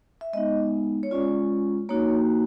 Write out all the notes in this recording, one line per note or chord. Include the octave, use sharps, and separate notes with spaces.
E5
G#3 B3 D#4 D#5
C#5
G#3 C#4 F4 D5
A#3 D#4 F#4 C#5